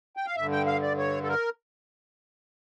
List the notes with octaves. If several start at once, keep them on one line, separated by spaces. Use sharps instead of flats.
G5
F5
G2 D3 E5
G5
F5
D5
C#5
A4
A#4